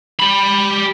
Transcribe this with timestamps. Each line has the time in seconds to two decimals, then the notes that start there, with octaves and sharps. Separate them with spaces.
0.19 G4 B5